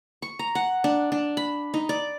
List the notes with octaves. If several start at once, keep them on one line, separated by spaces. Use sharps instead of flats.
C#6
A#5
F#5
D4
D4
B5
D#4
D5